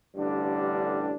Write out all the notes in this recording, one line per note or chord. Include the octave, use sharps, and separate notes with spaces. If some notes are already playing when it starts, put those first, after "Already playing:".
A1 G2 D3 G3 D4